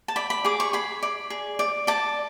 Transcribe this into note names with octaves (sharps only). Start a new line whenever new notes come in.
A5
D5 B5
B5
G#4 D6
C#6
G#4 B5
D5
G#4
D5
D5 A5